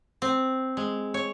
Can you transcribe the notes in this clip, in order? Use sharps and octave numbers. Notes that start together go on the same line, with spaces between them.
C4
G#3
C#5